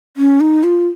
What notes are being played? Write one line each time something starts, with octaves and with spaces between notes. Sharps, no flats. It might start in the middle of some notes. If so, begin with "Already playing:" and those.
C#4
D#4
F4